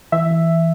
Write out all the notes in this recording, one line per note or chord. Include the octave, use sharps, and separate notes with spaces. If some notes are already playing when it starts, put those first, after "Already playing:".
E3 E5
E3